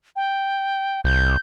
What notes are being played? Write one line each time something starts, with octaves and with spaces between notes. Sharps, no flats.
G5
C2 G6